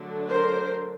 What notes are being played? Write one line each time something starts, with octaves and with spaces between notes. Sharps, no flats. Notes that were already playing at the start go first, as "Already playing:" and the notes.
Already playing: D3 F#3 A3 D4
A#4 C5